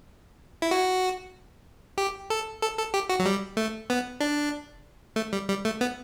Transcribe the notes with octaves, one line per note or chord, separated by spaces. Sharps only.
E4
F#4
G4
A4
A4
A4
G4
F#4
F#3
G3
A3
B3
D4
A3
G3
G3
A3
B3